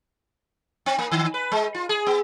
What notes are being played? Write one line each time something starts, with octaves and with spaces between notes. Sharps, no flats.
C4
A#3
D#3
B4
G#3
F4
G#4
B3